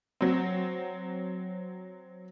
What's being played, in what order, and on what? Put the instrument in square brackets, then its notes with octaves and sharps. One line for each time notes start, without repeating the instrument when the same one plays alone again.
[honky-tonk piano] F#3 C4